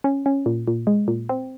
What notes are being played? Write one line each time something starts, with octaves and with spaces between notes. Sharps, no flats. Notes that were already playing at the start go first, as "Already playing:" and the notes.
C#4
C#4
A#2
A#2
G#3
A#2
C4